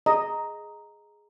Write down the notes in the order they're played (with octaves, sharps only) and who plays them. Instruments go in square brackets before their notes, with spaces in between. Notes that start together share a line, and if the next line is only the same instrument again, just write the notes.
[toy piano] G#4 A#5 [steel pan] D#5